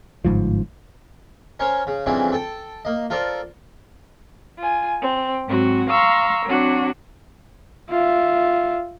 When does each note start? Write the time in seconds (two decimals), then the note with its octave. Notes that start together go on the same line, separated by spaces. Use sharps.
0.25 G1 G#2 F3
1.60 C#4 A#4 C5 C#5
1.87 C#3
2.06 F2 C#3 E3 G3 C4 D4
2.32 A4 G5 A5
2.85 A#3 D#5
3.10 F4 A4 A#4 C5 D5
4.59 F4 G#5
5.03 C4
5.48 G#2 F#3 C4 F#4
5.89 F5 A#5 C6 C#6 E6
6.45 F#3 C4 D4 F#4
7.90 F4 E5